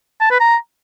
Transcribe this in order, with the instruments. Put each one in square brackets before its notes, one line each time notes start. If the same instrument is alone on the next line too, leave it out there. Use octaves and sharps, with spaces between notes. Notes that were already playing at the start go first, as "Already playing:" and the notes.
[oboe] A5
B4
A#5